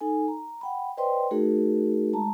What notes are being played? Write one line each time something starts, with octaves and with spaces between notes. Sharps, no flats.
D#4 A4 G#5
A#5
F#5 G5 B5
B4 C5 D5 D#5 G5 C6
A3 D#4 F#4 G#4 A#4
G#3 A5 A#5